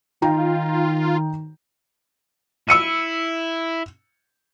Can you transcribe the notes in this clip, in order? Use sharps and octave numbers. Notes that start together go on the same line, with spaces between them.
D#3 D#4 F4 G5 A#5
E4 E6 C#7 D#7